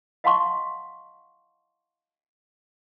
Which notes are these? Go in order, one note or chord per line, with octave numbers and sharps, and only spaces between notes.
D#5 F5 F#5 A5 C6 C#6